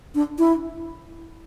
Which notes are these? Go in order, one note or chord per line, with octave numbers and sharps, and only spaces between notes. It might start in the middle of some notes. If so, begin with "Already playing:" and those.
D4
E4